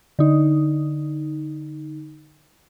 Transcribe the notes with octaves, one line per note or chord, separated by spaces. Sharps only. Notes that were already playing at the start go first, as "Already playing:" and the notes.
D3 D#4